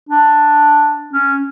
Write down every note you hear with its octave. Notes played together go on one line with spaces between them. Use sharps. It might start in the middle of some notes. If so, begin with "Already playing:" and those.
D4
C#4